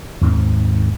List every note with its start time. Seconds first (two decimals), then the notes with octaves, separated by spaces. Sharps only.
0.21 D#2 G#2 C4